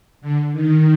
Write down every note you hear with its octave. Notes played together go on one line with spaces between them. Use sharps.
D3
D#3